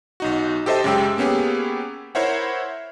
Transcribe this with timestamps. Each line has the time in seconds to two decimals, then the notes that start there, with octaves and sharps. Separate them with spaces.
0.20 B1 D#4 F#4
0.66 G4 A4 C5 D#5 E5 A5
0.84 F#2 C#3 G#3 G4 G5 E6
1.18 A#3 B3 C#4 G4 G#4
2.15 E4 A#4 C5 C#5 E5 F#5